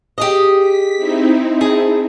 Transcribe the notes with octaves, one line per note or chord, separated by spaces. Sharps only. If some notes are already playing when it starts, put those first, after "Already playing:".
G4 G#4 D#5
B6
C4 D#4 E4
G#4 A5